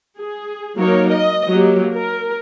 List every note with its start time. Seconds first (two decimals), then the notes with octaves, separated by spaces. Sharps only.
0.17 G#4
0.78 F#3 A#3 D#4 A#4 C#5
1.08 D#5
1.50 F#3 A#3 G4
1.93 A#4